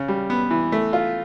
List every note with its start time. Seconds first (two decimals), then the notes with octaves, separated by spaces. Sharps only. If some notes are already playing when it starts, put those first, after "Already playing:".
Already playing: C#3
0.08 G3
0.30 B3
0.50 E3
0.72 A3
0.93 F4